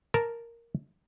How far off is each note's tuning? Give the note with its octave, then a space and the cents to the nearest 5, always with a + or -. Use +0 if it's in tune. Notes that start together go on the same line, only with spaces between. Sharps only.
A#4 +0 A5 +0